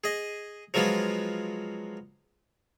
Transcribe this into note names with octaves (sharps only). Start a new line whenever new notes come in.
G#4 D#5
F3 F#3 G#3 B3 F4